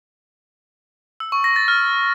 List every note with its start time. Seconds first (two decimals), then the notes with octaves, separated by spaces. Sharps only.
1.20 E6
1.32 C#6
1.44 A#6
1.56 A6
1.68 F6